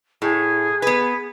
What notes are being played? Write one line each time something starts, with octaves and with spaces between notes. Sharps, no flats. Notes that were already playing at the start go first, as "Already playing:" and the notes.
A2 G#4
B3 B4